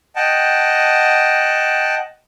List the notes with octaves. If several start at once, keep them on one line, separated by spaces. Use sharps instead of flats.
D#5 F#5 G5 A5